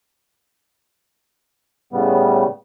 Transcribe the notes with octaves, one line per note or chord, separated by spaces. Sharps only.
A2 C#3 G3 B3